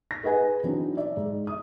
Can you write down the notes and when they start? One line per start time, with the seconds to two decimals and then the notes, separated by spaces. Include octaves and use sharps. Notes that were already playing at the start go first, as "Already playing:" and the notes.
0.11 A#6
0.23 G#4 B4 D#5 F#5 G#5
0.63 E3 F#3 C4 D4 D#4
0.97 D5 E5
1.17 G#2
1.47 E5 D#6